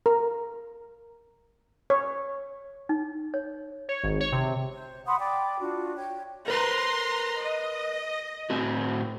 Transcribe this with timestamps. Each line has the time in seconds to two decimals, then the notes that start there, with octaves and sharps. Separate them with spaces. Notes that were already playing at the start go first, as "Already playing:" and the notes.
0.06 A#4
1.90 C#5
2.89 D#4
3.34 C#5
3.89 C#5
4.03 G#1
4.20 C#5
4.32 C3
4.72 C5
5.06 F#5 B5 C6 D#6
5.19 D5 G5 B5 D6
5.60 D4 F4 F#4
5.95 C#5 G5
6.48 A#4 B4 A#5 C6
7.41 D#5
8.50 A2 C4 F#4